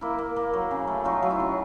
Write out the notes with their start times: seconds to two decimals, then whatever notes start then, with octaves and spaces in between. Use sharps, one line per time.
0.01 A#3 E4
0.18 A#3
0.36 A#3
0.53 F#3
0.71 C#3
0.87 A3
1.04 F#3 D#4 F4
1.23 F#3
1.30 E4
1.40 C#3